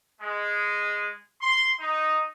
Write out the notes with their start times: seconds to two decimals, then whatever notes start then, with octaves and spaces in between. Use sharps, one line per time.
0.21 G#3
1.42 C6
1.80 D#4